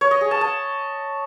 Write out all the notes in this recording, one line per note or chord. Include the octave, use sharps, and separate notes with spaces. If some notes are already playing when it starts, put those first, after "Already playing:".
C#5
D#5
G#4
A5
A5